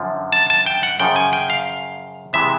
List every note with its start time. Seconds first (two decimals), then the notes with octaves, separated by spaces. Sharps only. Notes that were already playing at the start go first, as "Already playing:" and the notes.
Already playing: F#2 D3 F3
0.32 A5
0.50 A5
0.66 G5
0.83 F#5
1.00 F#2 C#3 F3 G5
1.16 G#5
1.33 G5
1.50 F5
2.33 C3 E3 G#3 B3 E5